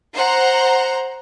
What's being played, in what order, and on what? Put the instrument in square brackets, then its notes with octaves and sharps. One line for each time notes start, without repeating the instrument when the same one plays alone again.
[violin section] C5 F#5 A#5